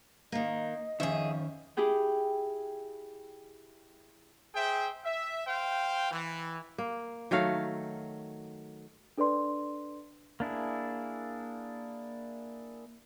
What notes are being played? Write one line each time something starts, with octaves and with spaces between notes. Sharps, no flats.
D#3 A#3 D#5
F2 D#3 C#4 G#4 E5
E4 G4 G#4 G5
G#4 C5 E5 G5
E5
C5 F5 G5
E3
A#3
D#3 F#3 A3 F5
D4 A4 B4 D5 C6
A#3 D4 E4 G#4